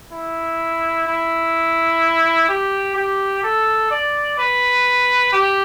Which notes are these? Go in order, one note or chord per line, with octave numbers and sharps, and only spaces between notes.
E4
E4
G4
G4
A4
D5
B4
G4